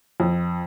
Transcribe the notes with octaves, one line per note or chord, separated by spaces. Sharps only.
F2